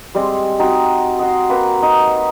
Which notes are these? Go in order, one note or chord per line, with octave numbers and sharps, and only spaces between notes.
G3 G#3 C4
C4 D#4 F#4 G5
D#5 F#5 C6
A#3 C4 B4
D#4